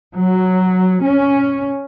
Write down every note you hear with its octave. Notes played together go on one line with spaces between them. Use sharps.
F#3
C#4